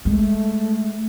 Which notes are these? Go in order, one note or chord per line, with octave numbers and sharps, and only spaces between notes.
G#3 A3